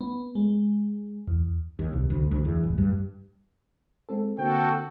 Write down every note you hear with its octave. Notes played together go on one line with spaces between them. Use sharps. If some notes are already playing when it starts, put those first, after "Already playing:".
B3
G#3
E2
D#2
C2
D2
D2
E2
D1
G2
G#3 C4 A4
D3 A#3 C4 F#4 A4 G5